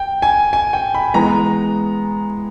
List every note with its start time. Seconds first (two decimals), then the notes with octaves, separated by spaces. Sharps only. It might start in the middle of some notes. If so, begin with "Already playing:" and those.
Already playing: G5
0.22 G#5
0.53 G#5
0.73 G5
0.95 B5
1.14 E3 G#3 B3 A#5